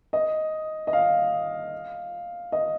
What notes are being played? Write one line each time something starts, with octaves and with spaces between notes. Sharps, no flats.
D#5
D#5
F5
D#5